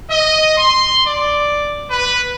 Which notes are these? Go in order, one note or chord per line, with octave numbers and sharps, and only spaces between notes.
D#5
C6
D5
B4